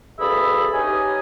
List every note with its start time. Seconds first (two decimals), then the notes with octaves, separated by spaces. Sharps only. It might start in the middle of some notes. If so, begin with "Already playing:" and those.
0.19 D2 G2 G#4 A4 E5 B5
0.74 C#4 D#4 G4 B4 D#5 G#5